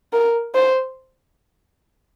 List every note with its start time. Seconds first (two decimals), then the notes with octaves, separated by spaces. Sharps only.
0.13 A#4
0.55 C5